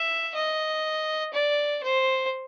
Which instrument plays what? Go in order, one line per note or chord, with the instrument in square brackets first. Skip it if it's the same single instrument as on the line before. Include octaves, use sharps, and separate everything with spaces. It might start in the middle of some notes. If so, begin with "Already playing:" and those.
Already playing: [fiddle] E5
D#5
D5
C5